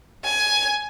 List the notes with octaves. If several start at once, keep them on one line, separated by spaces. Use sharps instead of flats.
G#5